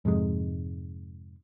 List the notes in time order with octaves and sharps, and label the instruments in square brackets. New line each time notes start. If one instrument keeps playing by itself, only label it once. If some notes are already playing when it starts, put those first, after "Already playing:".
[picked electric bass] F2 G#2 C3 G#3